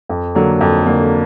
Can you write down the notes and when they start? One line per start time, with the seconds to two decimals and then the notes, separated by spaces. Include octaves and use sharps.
0.09 F2
0.35 D3 F#3 A#3
0.61 F2
0.86 D3 F#3 A#3